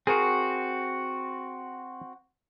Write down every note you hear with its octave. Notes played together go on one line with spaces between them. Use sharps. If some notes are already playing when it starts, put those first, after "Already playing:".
C4 F#4 G#4 A#4